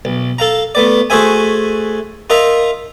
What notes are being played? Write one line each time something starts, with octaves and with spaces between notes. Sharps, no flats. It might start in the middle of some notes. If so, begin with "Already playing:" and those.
B1
A4 F5 A#5
A3 B3 D5
A3 F#4 G#4 C5 E5 G#5
F4 A#4 D#5 E5 A#5